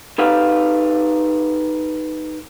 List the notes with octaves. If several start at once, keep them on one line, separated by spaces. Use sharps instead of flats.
D#4 G4 A4 B4 F5